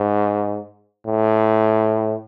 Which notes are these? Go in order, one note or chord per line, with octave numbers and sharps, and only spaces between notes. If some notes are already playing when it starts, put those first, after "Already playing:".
Already playing: G#2
A2